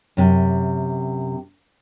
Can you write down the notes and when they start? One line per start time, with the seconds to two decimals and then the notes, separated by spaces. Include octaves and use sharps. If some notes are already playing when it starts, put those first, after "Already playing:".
0.17 F#2 C3